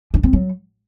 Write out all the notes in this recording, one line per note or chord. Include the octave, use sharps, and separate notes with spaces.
D4
C4
F#3